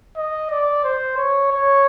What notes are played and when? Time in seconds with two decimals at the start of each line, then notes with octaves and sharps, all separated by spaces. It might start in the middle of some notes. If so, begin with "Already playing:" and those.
0.17 D#5
0.51 D5
0.84 C5
1.17 C#5
1.52 C#5